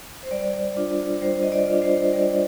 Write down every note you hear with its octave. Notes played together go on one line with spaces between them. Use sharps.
C5
G3 D5
D4 F4
G3 C5
D#5
D5
D4 F4
C5
G3 D5